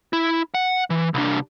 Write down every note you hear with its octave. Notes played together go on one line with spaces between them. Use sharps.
E4
F#5
E3
C2 D4